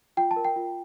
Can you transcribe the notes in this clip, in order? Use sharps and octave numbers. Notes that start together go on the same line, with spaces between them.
F4 G5
A5
A#4
G5
F4